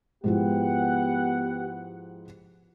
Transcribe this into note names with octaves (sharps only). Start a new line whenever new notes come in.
G#2 F3 B3 E4 G4 F#5